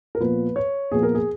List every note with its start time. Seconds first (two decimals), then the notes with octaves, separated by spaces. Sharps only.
0.15 A#4
0.20 A#2 F3 B3 B4
0.56 C#5
0.92 A#2 F3 B3 G#4
1.03 A#4
1.15 G#4